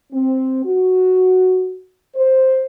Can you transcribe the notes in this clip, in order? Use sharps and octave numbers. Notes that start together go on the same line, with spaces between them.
C4
F#4
C5